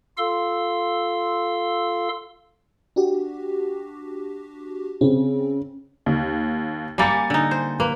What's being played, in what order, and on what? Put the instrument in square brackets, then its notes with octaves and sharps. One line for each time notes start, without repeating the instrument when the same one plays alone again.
[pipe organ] F4 A4 F5 C6 E6
[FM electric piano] D4 F#4 G4
[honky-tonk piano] C#3 [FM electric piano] C4
[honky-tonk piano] D#2
[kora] G3 A#3 G4 [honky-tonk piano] G#5 A6 C#7
[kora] D3 D#4
C5
[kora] A#3 [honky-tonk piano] B4